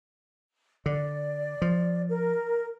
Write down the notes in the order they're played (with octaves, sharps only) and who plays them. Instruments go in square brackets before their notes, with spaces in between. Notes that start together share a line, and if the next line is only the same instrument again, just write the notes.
[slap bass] D3 [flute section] D5
[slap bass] F3
[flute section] A#4